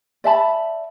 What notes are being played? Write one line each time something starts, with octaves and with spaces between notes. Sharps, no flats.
D5 E5 A5 B5